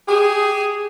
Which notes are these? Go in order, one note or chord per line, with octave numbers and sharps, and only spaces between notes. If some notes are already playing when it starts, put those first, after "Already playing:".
G4 G#4